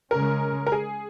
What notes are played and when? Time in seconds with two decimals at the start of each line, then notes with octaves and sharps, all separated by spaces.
0.11 C#3 G#3 C#4 A#4
0.67 A#4
0.72 G#4